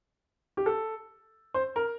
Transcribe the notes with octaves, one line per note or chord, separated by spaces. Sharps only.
G4
A4
C5
A#4